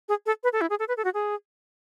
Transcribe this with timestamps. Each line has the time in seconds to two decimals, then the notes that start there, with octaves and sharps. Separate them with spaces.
0.09 G#4
0.26 A4
0.44 B4
0.53 A4
0.61 E4
0.70 G#4
0.79 A4
0.88 B4
0.97 A4
1.05 F#4
1.14 G#4